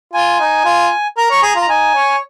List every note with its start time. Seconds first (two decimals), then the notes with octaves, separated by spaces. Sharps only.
0.13 F4 G#5
0.40 D#4
0.65 F4
1.17 A#4 A#5
1.31 C#5
1.43 G#4
1.56 F4
1.62 A#5
1.68 D#4 G#5
1.95 C#5